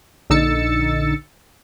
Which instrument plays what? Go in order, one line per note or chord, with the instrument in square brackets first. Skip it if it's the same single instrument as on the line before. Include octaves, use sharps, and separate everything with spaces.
[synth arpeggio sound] A#1 D3 D#4 E6 A6 C#7